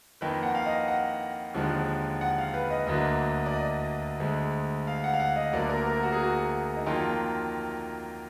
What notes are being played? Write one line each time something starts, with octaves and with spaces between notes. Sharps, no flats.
F2 D#3 A#3 B4
F#5
F5
D#5
F#5
D#2 D3 F3 G#3
F#5
F5
B4
D#5
D2 D3 F#3 A#3 D#5
D5
D#5
D2 D3 G#3
F5
F#5
F5
F#5
D#5
D2 D3 F#3 A#3 D5
A#4
A#4
F#4
G#4
F#4
D#4
F2 D#3 F#3 A#3 F4